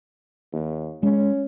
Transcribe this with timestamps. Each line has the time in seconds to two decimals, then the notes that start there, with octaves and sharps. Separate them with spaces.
0.53 D#2
1.03 G#3 C#4